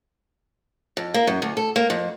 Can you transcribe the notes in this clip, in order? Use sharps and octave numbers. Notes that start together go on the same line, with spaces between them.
F2
A#3
F#2
D2
A4
A#3
F2